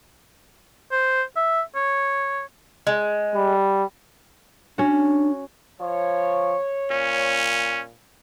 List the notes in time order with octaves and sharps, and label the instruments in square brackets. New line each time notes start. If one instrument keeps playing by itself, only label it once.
[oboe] C5
E5
C#5
[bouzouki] G#3
[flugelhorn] G3
[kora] C#4 F#4 [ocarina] D4
[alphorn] F3 [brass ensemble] C#5
[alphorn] A#2 [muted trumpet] C#4